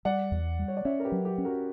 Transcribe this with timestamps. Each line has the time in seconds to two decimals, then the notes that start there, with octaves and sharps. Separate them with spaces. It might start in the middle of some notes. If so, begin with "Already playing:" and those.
0.05 G3 D5 F#5
0.32 E2
0.59 G3
0.68 C#5
0.77 D5
0.85 C#4 C#5 E5
1.00 A#4
1.05 G4 B4
1.12 F#3
1.25 G4
1.38 C#4
1.45 F#4 A#4